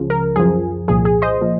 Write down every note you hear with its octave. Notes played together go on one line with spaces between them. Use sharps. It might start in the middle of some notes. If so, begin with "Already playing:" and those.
Already playing: C#2 C#3 F3
A#4
F#2 F3 G#4
C2 A#2 F3 G#4
G#4
C5 D#5
A#2 F3